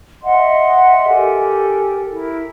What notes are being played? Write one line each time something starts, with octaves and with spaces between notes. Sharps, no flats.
D#5 E5 F#5 C6
G4 A4 A#4 G#5
E4 A#4